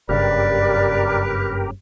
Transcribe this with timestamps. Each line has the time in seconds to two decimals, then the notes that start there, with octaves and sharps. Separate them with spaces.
0.09 F#1 G2 C#3 G4 A#4 B4 D5